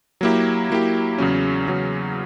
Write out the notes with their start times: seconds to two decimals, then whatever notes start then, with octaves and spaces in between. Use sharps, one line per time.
0.21 F#3 A#3 E4 G4
0.70 F#3 A#3 E4 G4
1.18 E2 C#3 F#3 C#4
1.68 E2 C#3 F#3 C#4